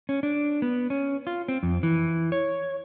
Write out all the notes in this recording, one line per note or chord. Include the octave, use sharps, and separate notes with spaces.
C#4
D4
B3
C#4
F4
C4
F2
E3
C#5